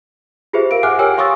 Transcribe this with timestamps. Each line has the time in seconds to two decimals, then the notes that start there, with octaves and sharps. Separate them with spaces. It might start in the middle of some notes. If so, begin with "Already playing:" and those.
0.53 F4 G4 G#4 B4 C5 E5
0.71 A#4 F5 D7
0.83 E5 F#5 G#5 D6 F6 F#6
0.99 G4 A#4 C#5 G5 G#5 E6
1.17 F5 C6 C#6 D#6 E6 A6